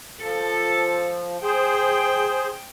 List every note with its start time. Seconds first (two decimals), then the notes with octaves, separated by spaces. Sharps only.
0.21 F3 A4
1.42 G#4 C5 G5